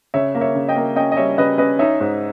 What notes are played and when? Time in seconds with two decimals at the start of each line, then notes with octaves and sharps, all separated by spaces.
0.14 C#3 C#5 E5
0.35 A#3
0.41 C#5 E5
0.55 C#3
0.68 D#5 G5
0.75 A#3
0.96 C#4 D#5 G5
1.12 D#5
1.16 G3 C#5 E5
1.38 C#3 B4 D#5
1.58 C#4 B4 D#5
1.79 D#4 C#5 E5
2.00 G#2